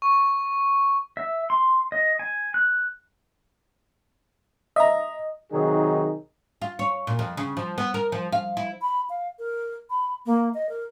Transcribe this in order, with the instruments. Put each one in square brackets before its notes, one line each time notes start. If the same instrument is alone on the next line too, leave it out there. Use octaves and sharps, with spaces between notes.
[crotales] C#6
[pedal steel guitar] E5
C6
D#5
G#5
F#6
[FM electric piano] D#5 [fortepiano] E5 A#5
[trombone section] C3 D#3 F#3 D#4 G#4
[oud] F4
C#5
A#2
F2
C#3
F3
B3
A#4
F3
F5
E4
[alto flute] B5
F5
A#4
B5
A#3
D#5
A#4